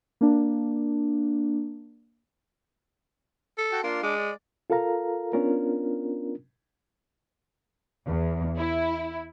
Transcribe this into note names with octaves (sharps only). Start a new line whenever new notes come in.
A#3 D4
A4
F#4 G5 A5
A#3 D4 F4 C6
G#3 D4 D6
D5
F4 A4 A#4 F5 A#5
B3 C#4 D4 F4 A#4
E2
E4